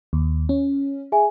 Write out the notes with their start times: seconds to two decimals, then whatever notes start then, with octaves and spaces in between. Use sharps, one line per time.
0.13 D#2
0.49 C#4
1.12 G#4 E5 G#5